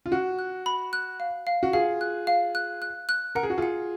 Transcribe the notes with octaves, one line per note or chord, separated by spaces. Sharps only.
F4
F#4 F#6
F#6
B5
F#6
F5
F5
F#4
F4 G#4 F5
F#6
F5
F#6
F#6
F#6
A#4 F#5
G#4
F#4
F4 G#4 F#5